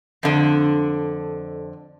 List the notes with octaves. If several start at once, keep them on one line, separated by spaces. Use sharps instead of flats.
F2 D3